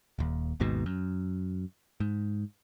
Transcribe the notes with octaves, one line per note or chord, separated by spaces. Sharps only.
D#1 D#2
G#1 D#2 G#2 B2
F#2
G#2